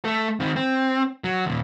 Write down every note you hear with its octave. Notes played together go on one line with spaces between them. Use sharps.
A3 A4
D#3 C4
C4
F#3
D#2 A#2